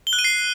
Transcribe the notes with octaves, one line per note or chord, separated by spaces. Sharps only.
G7
F#6
D#7
C7